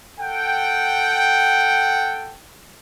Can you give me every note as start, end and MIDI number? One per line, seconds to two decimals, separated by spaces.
0.20 2.37 69
0.20 2.37 78
0.20 2.37 79